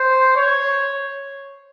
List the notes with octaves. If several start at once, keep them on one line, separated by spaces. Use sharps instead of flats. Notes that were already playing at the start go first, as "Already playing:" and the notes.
Already playing: C5
C#5